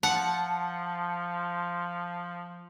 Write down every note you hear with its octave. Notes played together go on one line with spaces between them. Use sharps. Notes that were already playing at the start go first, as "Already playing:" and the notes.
F3 F#5 A5 C#7